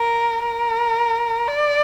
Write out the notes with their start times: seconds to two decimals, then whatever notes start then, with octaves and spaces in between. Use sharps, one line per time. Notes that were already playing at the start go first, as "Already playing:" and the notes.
Already playing: A#4
0.43 A#4
1.48 D5